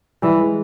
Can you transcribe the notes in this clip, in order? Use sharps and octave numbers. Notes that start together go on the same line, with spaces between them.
E3 G3
G#3